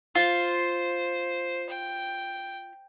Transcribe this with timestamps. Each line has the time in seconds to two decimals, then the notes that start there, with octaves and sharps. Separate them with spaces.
0.15 F4 C5
1.69 G5